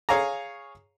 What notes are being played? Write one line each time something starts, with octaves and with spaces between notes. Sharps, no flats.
G#4 C#5 F5 G#5 A#5